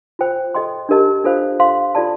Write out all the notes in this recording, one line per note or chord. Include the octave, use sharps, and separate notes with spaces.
F4 C5 G5
A4 D#5 G5 C6
D4 G4 A#4 D#5 A5
D4 F4 A4 C5 F5
C5 F5 C6
F4 A4 D5 A5